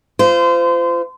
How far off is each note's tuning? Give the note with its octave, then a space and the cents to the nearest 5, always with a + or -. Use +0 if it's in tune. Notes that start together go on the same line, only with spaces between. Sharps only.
F4 -25 C5 -30